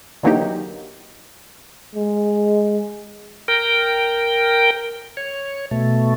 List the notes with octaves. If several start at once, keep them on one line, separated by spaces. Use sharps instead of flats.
D3 E3 F#3 A#3 D#4 G4
G#3
A#4 G5
C#5
B2 A3